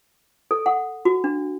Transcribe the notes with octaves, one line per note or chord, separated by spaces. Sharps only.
A4
F#5
F#4
D4